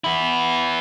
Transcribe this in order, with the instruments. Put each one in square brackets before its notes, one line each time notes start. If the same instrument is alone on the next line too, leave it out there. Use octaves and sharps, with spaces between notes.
[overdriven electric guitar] B3 E4